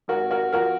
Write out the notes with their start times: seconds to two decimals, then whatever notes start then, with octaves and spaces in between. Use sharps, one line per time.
0.08 G#1 F#4 A#4
0.31 F#4 A#4
0.52 F3 F#4 A#4